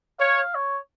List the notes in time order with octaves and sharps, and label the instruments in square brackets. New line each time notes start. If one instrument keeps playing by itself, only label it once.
[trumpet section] C#5 [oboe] F5
[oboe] C#5